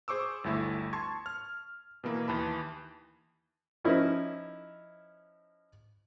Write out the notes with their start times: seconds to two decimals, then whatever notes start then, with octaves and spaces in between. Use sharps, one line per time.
0.08 G#4 C5 C#6 D6 E6
0.44 G1 D2 A3 E4
0.93 A5 C6 C#6 G#6
1.26 F6
2.04 B2 E3 A#3
2.28 D#2 E3 A5 B5
3.84 F3 C#4 D#4 E4 A#4